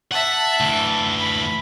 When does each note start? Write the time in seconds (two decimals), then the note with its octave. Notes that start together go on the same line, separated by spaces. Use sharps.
0.12 E5 F#5 A5
0.61 D2 E3
1.18 B5